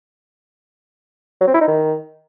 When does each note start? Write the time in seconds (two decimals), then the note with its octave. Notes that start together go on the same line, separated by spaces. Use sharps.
1.41 F#3
1.47 C4
1.54 E4
1.61 D#4
1.68 D#3